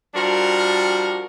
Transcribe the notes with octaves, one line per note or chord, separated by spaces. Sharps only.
F3 G3 D4 F#4 A#4